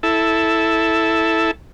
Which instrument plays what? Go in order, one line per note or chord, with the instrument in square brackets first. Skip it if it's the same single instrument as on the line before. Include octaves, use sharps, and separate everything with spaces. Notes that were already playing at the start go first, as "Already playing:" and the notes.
[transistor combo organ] E4 A4